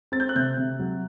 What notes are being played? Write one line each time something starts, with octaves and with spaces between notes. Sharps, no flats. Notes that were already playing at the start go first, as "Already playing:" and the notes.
C4 A6
G6
F#6
C3 G6
C3
F#3